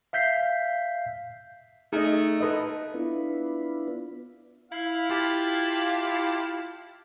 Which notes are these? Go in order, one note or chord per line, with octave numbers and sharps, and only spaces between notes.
E5 F5 G6 B6 C7
A3 D#4 G#4 D#5
A4 B4 D#5
B3 D4 E4 F4 B4
E4 F5
F4 G4 A5